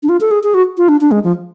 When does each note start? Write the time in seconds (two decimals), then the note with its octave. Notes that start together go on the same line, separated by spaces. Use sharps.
0.03 D4
0.09 F4
0.21 A4
0.31 G#4
0.43 G#4
0.54 F#4
0.77 F4
0.89 D4
1.01 D4
1.11 G#3
1.24 F3